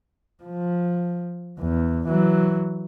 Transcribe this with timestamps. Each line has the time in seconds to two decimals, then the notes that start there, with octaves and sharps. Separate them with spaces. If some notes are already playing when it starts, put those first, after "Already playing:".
0.43 F3
1.59 E2
2.08 E3 F#3